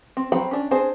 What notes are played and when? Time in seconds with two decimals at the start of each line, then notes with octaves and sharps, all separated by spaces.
0.17 C4
0.32 F#3 C4 G5 B5
0.51 C#4 D4
0.71 C4 D4 G#4 C5